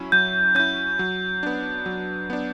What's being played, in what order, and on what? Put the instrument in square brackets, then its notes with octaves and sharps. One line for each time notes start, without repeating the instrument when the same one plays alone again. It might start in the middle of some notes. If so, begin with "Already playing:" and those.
Already playing: [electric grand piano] F#3 C#4 E4
[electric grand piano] F#3 [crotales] G6
[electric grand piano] C#4 E4 [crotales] G6
[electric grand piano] F#3
B3 D4
F#3
B3 D4